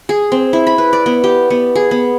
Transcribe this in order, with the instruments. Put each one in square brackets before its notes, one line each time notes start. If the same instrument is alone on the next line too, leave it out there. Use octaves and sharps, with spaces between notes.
[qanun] G#4
C4
E4
B5
B4
D5
B3
G4
B3
G#4
B3